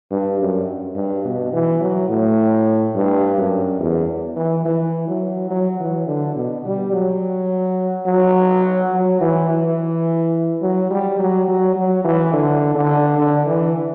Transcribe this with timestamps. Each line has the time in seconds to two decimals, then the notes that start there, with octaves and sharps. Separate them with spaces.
0.11 G2
0.40 F#2
0.95 G2
1.25 B2
1.53 E3
1.81 F#3
2.09 A2
2.95 G2
3.37 F#2
3.80 E2
4.37 E3
4.65 E3
5.08 F#3
5.50 F#3
5.80 E3
6.07 D3
6.36 B2
6.65 G3
6.93 F#3
8.06 F#3
8.93 F#3
9.21 E3
9.49 E3
10.62 F#3
10.90 G3
11.19 F#3
11.48 F#3
11.76 F#3
12.05 E3
12.33 D3
12.75 D3
13.18 D3
13.47 E3